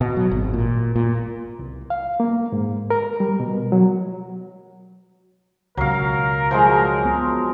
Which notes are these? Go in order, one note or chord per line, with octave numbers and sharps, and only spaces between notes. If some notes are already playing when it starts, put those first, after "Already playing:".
B2
F#3
G#1
A#2
A#2
C2
F5
A#3
G#2
A#4
G3
B2
F#3
C#2 B2 F#3 A#4 F5
F3 F#3 G#3
B3